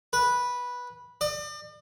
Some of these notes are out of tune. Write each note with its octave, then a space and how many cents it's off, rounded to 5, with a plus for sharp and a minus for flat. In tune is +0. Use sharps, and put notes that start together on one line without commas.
B4 -10
D5 +40